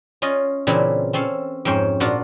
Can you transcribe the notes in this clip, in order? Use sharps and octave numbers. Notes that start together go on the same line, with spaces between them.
C#4 F4 D#5
A#2 C#3 E3 C4 D4 E4
C4 C#4 A4 F5
F2 G#2 C#4 C5 G5
A#2 D4 F4 F#4